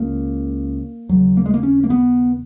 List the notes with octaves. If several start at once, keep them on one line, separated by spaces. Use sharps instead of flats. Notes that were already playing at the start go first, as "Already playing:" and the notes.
Already playing: C#2 C#3 A#3
D#2 C#3 F#3
A#3
G#3
A#3
C#4
A#3
B3